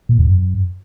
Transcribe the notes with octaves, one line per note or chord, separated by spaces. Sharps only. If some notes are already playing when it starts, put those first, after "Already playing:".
A#2
E2
F#2